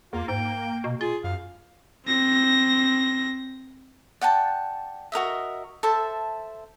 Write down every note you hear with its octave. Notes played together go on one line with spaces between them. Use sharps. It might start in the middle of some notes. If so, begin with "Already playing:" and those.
E2 A#3 F4
G#2 G5
B2
F4 G#4
F#2 F5
C4 A#6
D5 F#5 G5 A5
F#4 A#4 D#5 E5
A4 C5 E5 A5